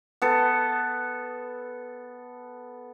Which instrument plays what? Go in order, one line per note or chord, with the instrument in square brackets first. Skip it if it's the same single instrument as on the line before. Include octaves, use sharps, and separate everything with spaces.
[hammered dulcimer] B3 A4